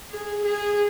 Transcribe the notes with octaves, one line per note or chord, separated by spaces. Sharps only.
G#4
G#4